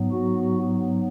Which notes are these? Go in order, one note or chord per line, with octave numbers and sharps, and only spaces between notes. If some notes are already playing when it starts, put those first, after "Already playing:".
Already playing: G#2 F#3 B3
F#4